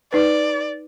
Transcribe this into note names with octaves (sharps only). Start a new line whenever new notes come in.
D#4 B4 D5